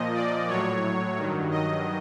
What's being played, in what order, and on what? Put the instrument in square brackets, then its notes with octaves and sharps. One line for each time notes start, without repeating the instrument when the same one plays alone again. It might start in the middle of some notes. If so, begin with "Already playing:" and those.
Already playing: [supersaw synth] A#2 F3 D#5
D5
A2 F#3 C#5
G2 D#3 F#3
D#5